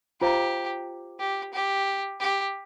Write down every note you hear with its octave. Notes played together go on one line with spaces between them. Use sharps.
F4 G4 C5 F5 A#5
G4
G4
G4